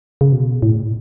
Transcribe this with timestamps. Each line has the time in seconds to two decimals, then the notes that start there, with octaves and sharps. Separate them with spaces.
0.21 C#3
0.33 B2
0.62 A2